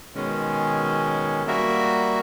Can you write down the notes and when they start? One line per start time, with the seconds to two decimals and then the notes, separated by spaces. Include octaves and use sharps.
0.16 B2 D#3 G#3 C#4
1.47 G3 A#3 F#4 A#4 E5